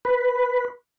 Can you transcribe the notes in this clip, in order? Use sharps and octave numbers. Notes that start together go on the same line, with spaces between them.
B4